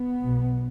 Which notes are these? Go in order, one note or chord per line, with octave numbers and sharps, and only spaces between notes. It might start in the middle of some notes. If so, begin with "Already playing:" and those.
Already playing: B3
B1 B2